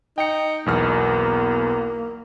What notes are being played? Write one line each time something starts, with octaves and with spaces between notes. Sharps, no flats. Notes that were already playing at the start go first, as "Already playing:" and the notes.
D#4 G5 C#7
B1 E2 A#3 F6